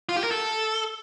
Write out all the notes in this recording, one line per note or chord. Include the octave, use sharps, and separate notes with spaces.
F4
G4
A#4
A4